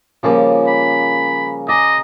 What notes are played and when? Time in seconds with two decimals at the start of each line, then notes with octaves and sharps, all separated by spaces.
0.23 C#3 F3 G3 A#3
0.68 A#4 B5
1.69 G#4 D5 D#5 A#5